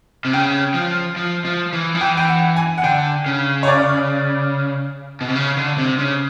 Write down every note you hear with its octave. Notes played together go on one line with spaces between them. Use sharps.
C3
C#3 G5
F3
F3
F3
E3
F3
E3 G5
G5
F#5
G#5
F#5
D3 G5
C#3
C#5
D5
B2
C3
C#3
D3
C3
C#3